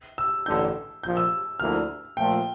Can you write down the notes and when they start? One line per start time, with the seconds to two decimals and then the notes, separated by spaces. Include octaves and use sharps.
0.18 E6
0.46 A1 G2 D3 G6
1.03 A#1 A#2 F3 G6
1.17 E6
1.60 D2 D3 F3 A#3 E4 F6
2.17 A#2 F3 A3 G5